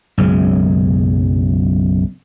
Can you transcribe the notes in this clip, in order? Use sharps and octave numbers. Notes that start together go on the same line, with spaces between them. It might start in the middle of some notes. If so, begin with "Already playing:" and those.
B1 F#2 C#3 G#3